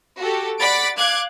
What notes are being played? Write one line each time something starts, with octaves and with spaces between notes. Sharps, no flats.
F#4 G4 A4
D5 F#5 B5 A6 B6 D7
F5 D6 F#6 G#6